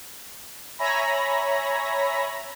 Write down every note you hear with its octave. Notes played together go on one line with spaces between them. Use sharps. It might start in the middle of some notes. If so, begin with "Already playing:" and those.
C#5 E5 G#5 A#5 B5 A#6